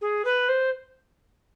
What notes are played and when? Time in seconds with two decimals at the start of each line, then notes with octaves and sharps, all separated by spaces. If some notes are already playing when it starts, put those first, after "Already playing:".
0.01 G#4
0.25 B4
0.49 C5